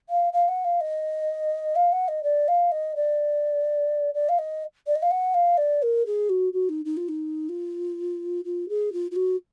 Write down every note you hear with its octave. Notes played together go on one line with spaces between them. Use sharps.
F5
F5
F#5
F5
D#5
F5
F#5
D#5
D5
F5
D#5
D5
D5
F5
D#5
D5
D#5
F5
F#5
F5
D5
A#4
G#4
F#4
F#4
D#4
D#4
F4
D#4
F4
F4
G#4
F4
F4
F#4